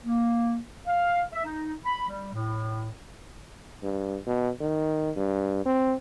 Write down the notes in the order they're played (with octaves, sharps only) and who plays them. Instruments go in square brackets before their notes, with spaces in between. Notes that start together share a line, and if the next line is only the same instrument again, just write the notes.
[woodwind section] A#3
F5
E5
D#4
B5
G3
A2
[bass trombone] G2
B2
D#3
G2
C4